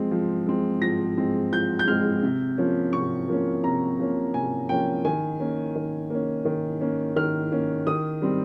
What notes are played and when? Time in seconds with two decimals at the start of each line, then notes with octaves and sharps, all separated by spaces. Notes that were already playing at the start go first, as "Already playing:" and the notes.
Already playing: F3 G#3 C4
0.11 F3
0.47 G#3 C4
0.82 F3 A#6
1.17 G#3 C4
1.52 F3 G6
1.79 G6
1.87 G#3 C4 F6
2.23 C3
2.58 F3 A#3 C#4
2.93 C3 C#6
3.28 F3 A#3 C#4
3.64 C3 A#5
3.99 F3 A#3 C#4
4.34 C3 G#5
4.69 F3 A#3 C#4 G5
5.05 D#3 G#5
5.40 A#3 C#4
5.75 D#3
6.10 A#3 C#4
6.45 D#3
6.81 A#3 C#4
7.16 D#3 F6
7.52 A#3 C#4
7.87 D#3 D#6
8.22 G3 C4